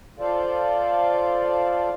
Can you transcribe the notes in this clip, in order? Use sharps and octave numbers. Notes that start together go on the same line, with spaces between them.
F4 A4 C5 D5 F5